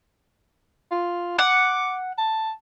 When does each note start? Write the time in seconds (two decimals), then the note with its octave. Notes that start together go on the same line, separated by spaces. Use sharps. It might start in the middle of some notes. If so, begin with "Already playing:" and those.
0.92 F4
1.39 F#5 D6
2.18 A5